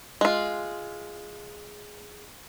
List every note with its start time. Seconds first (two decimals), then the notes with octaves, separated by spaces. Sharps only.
0.21 G#3 F4